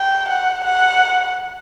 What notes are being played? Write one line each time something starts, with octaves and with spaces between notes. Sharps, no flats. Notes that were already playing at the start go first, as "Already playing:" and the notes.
Already playing: G5
F#5
F#5